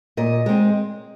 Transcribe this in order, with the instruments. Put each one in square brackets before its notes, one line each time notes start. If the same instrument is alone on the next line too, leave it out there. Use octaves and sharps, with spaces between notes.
[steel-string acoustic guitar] A#2 D#5
G#3 C4